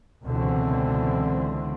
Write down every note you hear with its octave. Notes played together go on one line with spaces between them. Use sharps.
C#2 B2 D3 E3 C4